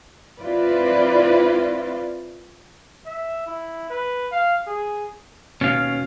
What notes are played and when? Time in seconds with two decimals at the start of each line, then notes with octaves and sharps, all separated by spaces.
0.40 C4 E4 F4 B4 D5
3.06 E5
3.46 E4
3.90 B4
4.32 F5
4.67 G#4
5.61 D#2 B2 C#4 F5